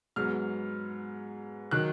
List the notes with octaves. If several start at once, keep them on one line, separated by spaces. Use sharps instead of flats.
G#2 F#3 B3 F6
D#3 F#3 F#6